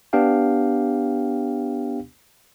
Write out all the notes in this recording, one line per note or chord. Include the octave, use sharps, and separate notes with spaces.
B3 D4 G4 F5 G5